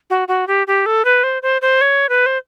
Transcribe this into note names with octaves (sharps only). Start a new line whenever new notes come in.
F#4
F#4
G4
G4
A4
B4
C5
C5
C5
C#5
B4
C5